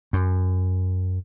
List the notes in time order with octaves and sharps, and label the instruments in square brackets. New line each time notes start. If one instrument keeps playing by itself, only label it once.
[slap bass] F#2